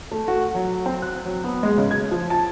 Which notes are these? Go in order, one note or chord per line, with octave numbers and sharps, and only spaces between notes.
A3
F#4
F#3
C4
F#6
F#3
B3
G#3
C#3
G#6
F3
A5